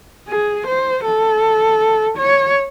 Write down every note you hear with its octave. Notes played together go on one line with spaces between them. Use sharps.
G#4
C5
A4
C#5